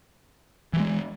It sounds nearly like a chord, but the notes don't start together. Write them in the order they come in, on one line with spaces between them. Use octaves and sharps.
E3 F#3 G#3